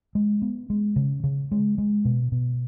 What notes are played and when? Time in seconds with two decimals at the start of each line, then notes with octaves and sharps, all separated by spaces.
0.15 G#3
0.42 B3
0.70 G#3
0.96 C#3
1.24 C#3
1.52 G#3
1.78 G#3
2.05 B2
2.32 B2